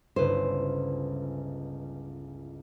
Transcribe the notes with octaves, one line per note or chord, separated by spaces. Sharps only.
G1 C#2 E4 B4 C5